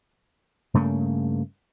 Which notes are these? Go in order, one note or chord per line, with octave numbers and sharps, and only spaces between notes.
G2 C#3 A3 A#3